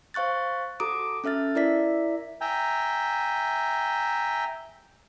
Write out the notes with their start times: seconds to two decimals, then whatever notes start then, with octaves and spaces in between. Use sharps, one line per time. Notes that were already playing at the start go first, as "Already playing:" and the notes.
0.14 C5 F5 C#6 F#6 A6
0.80 F#4 A4 A#5 D6 D#6 D7
1.24 C#4 A4 E5 F6 A6
1.55 E4 A#4 D5 E5 B6
2.41 E5 G5 G#5 A#5